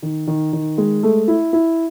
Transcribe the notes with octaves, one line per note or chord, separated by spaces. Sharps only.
D#3
D#3
D#3
G#3
A3
E4
E4